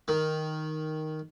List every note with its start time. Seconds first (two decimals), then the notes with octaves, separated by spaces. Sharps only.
0.08 D#3